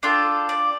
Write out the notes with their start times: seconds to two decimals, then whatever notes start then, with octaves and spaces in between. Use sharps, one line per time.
0.03 D4 F4 A4 G5
0.49 D5